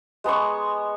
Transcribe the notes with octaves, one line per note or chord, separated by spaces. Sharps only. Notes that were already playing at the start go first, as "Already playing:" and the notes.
G#3 B3 A#5 C#6